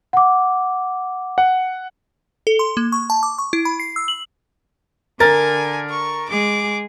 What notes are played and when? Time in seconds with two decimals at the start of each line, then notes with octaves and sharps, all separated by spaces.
0.13 F#5 D6
1.38 F#5
2.47 A4
2.59 C6
2.77 A#3
2.92 C#6
3.10 A5
3.23 D6
3.38 C#6
3.53 E4
3.65 B5
3.80 C7
3.96 E6
4.08 F#7
5.20 D3 A#4 G#5 A6
5.90 C#6
6.30 G#3 G#4 D6